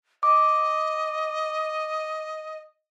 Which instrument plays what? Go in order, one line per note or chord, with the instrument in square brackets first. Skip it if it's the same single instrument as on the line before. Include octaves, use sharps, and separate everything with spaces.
[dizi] D#5 [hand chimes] D6